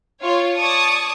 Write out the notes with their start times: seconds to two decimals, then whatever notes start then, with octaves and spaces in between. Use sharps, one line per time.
0.23 F4 C#5
0.58 C#5 D5 A5 C#6 D#6